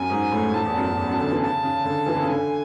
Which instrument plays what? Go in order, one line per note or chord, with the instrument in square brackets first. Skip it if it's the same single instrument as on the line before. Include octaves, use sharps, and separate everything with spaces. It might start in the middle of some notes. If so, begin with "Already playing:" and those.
Already playing: [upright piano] F#2 [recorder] G#5
[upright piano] G#2
A2
G#2
[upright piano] A2 [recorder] A5
[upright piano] E2
F#2
F#2
E2
F#2
D3
E3
[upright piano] C#3 [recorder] A5
[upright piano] C#3
D3
E3
D3
C#3
[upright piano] D3 [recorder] G#5